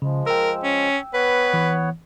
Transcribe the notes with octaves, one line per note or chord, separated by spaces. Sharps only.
C#3 F3 G#3
A#4 G5 E6
C#4
B3 B4 C#5 F#5
E3